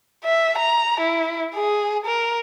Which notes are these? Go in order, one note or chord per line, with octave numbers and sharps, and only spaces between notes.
E5
A#5
E4
G#4
A#4